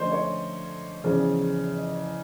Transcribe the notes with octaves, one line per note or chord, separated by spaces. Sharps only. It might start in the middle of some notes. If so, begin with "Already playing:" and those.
Already playing: D3 F3 A3 C#4 C5 D5 D#5
C#5
E2 C#3 F3 D5
D#5